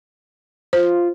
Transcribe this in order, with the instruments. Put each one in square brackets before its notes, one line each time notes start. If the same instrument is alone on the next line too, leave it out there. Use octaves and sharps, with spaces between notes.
[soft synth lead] F4 [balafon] C5